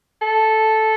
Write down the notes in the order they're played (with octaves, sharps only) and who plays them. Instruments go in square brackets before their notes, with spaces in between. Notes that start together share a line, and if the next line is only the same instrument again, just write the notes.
[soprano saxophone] A4